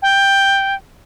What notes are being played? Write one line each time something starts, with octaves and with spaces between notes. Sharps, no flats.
G5